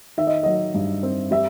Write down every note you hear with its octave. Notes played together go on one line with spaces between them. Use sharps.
D#3 E5
D#5
F#3 D#5
G2
C4
G3 E5